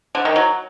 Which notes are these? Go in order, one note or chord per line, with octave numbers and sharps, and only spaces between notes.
D3
D#3
F#3